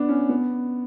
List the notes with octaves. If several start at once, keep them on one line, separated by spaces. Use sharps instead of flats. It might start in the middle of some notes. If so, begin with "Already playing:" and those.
Already playing: B3 D4
C#4
B3